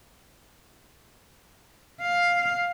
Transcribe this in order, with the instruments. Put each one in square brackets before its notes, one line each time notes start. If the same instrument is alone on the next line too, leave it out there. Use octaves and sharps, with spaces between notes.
[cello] F5